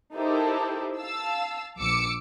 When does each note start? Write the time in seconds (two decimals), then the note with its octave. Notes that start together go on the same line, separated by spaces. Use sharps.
0.14 D#4 E4 G4 A4 A#4 C5
0.97 F5 A5 E6
1.78 A#1 D6 E6 C#7